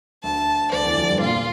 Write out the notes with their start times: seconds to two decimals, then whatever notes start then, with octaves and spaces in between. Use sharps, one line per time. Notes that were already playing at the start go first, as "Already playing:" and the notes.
0.24 D2 D3 A5
0.72 D2 D3 D5
0.85 E2 E3
0.97 F2 F3
1.09 G2 G3
1.21 A#2 A#3 F4